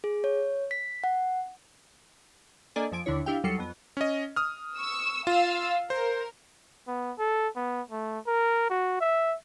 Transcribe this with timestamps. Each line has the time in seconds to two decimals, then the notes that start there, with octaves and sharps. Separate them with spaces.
0.04 G#4
0.24 C#5
0.71 B6
1.04 F#5
2.76 A#3 D4 A4 D5 D#5 G#5
2.92 F2 F3 G#5 D7
3.06 D#2 D3 D4 E4 C#5
3.26 D4 E4 G4 F5 G5
3.44 D#2 F#3 G3 A4 C7 C#7
3.58 F2 B3
3.97 C#4 D#5
4.36 D#6 F6
4.77 C#6 E6
5.27 F4 F5 E6
5.90 A#4 C5
6.87 B3
7.18 A4
7.56 B3
7.90 A3
8.26 A#4
8.69 F#4
9.00 E5